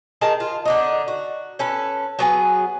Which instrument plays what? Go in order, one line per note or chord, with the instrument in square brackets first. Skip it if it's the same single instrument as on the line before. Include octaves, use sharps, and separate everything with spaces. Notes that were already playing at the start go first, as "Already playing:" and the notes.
[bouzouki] D#3 G#4 A#4 A5
F4
D3 D4 D#4
F#4
C#4 A4 B4
F#3 B3 G#4